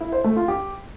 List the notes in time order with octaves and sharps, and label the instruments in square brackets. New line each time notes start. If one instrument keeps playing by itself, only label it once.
[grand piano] E4
C5
A3
F4
G4